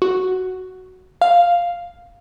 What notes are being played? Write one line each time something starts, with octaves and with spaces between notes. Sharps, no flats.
F#4
F5